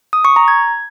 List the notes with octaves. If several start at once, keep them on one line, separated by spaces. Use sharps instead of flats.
D#6
C#6
A#5
G#6